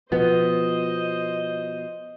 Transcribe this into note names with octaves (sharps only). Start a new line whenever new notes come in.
B2 F3 B3 C5 D#5